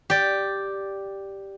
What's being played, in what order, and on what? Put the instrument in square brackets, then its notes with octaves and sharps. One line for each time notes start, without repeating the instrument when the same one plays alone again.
[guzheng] G4 D5